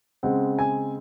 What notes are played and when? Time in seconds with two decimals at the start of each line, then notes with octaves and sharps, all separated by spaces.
0.23 C#3 G#3 C4 F#5
0.59 G#5